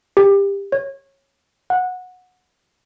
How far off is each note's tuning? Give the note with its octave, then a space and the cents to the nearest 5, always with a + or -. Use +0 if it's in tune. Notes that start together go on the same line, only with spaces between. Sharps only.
G4 +25
C#5 -20
F#5 -15